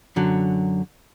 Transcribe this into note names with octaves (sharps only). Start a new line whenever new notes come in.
F#2 D3 F#3